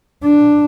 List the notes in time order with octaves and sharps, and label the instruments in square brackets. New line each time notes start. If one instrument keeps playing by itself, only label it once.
[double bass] D4